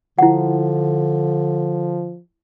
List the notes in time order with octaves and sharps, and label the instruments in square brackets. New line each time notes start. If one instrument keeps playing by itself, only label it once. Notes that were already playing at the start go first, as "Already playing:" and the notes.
[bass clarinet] D3 [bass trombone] F3 [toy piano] E4 F#5